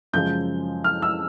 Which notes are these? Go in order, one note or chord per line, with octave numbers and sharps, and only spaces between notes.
F#2 C#3 F3 G#3 G6
F6
E6